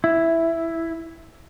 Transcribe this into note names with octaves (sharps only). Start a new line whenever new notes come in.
E4